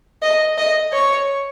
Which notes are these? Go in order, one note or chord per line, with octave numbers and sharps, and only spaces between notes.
D#5
D#5
C#5